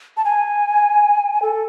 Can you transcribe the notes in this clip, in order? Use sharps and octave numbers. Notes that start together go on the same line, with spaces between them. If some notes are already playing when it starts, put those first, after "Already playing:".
A5
G#5
A4